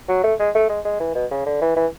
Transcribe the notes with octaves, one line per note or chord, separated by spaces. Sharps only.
F#3
A3
G#3
A3
G#3
G#3
E3
B2
C#3
D3
E3
E3